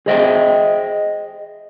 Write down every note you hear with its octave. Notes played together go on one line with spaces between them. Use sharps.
G#4 C5 D#5 E5 F#5 G5